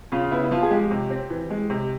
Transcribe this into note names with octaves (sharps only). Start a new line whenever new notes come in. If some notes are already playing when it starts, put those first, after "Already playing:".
C#3 F4
B3 E4
E4
F3 F4
G#4
G#3 G4
C3
C4
E3
G#3
C3